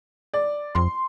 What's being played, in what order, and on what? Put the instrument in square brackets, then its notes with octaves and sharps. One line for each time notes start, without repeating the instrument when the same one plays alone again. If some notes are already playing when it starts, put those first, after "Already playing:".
[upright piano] D5
[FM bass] F2 [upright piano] C6